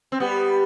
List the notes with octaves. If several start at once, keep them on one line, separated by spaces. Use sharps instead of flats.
C4
G3 B3